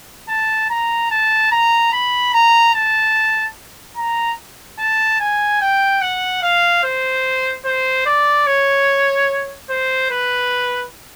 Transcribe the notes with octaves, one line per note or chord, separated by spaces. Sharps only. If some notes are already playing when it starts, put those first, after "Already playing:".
A5
A#5
A5
A#5
B5
A#5
A5
A#5
A5
G#5
G5
F#5
F5
C5
C5
D5
C#5
C5
B4